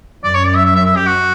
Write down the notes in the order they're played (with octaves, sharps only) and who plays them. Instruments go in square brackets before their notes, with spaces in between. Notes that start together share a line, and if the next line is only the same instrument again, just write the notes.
[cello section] F#2 [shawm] D5
[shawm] C#5
D5
E5
E5
E5
E5
G4
F#4